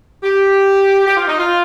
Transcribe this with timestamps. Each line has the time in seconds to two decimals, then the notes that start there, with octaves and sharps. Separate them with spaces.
0.22 G4
1.06 G4
1.16 F4
1.27 D#4
1.38 F4